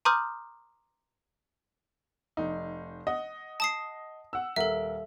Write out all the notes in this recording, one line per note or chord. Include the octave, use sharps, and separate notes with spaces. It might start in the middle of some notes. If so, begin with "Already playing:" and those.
A#5 C6 D6 D#6 F6 G6
F1 D#4
D#5 F#5
A5 D#6 C7
F#5 E6
D#1 A4 A#4 E5 F#5